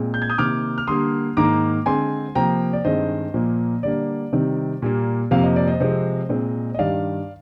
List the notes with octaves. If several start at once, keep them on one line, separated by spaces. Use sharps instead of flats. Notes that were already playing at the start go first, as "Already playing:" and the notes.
Already playing: A#2 G#3 C4
G6
G#6
D#6 G6
C3 D#3 A#3 D6 F6
F6
D3 G3 A#3 C6 D#6
G#2 D#3 A#3 A#5 D6
D3 G#3 C4 G#5 C6
C3 F3 A#3 G5 A#5
D5
G2 D#3 G#3 C4 C5 D#5
A#2 F3 A#3
D3 G3 A#3 D5
C3 D#3 G3 C4
A#2 G3 A#3
F2 C3 F3 A#3 F5
D#5
D5
C5 D#5
C3 F3 G#3 C4
A#2 G#3 C4
D#5
G2 D#3 G3 D5 F5